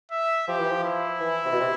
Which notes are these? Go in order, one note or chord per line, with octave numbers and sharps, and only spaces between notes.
E5
F3 G4
E3
F3
E4
E3
C3
B2
C3